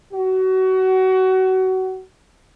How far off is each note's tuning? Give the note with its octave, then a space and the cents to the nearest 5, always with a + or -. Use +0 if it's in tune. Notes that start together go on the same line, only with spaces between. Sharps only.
F#4 +25